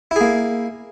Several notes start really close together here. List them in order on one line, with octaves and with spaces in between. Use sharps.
E4 G#4 A#3